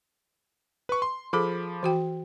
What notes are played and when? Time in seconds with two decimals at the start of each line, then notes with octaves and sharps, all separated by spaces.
0.89 B4 C#6
1.02 C6
1.33 F3 G#4 A4 B5 D6
1.83 E3 F#4 G5